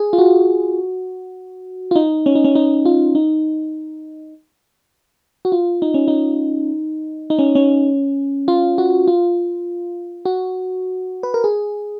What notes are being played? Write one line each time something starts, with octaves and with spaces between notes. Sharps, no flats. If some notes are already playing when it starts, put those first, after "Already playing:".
Already playing: G#4
F4
F#4
F4
D#4
C#4
D#4
C#4
D#4
F4
D#4
F#4
F4
D#4
C#4
D#4
D#4
C#4
C#4
F4
F#4
F4
F#4
B4
A#4
G#4